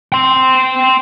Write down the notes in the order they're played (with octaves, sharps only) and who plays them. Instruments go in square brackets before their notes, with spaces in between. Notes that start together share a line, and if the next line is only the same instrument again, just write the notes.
[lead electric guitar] G5 C6